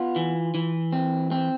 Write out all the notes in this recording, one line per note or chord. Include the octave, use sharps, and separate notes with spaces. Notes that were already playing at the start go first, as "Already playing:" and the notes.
Already playing: B3 F4
E3
E3
C4
C4